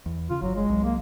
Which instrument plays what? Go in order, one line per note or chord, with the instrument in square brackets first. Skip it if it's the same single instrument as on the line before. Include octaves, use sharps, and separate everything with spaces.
[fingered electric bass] E2
[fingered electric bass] C#3 [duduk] F4
[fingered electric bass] G1 [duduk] F#3
[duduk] G#3
[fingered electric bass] C2 F#3
[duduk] A#3